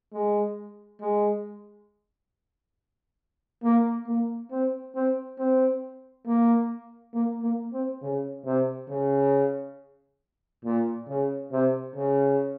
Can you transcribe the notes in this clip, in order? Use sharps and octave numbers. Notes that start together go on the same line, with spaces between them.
G#3
G#3
A#3
A#3
C4
C4
C4
A#3
A#3
A#3
C4
C#3
C3
C#3
A#2
C#3
C3
C#3